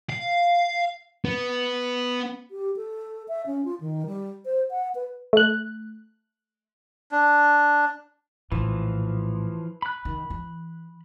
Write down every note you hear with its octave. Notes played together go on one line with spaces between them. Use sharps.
F5
B3
G4
A4
E5
C#4
F4
D#3
G3
C5
F#5
B4
A3 F#6
D4
A#1 A2 E3 F3
B5 F#6
D#3
E3